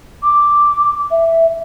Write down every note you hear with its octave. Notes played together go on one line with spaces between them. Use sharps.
D6
E5